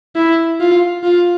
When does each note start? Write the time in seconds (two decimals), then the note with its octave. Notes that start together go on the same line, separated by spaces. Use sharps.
0.16 E4
0.60 F4
1.03 F4